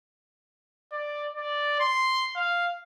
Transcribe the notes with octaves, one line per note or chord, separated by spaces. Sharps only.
D5
D5
C6
F5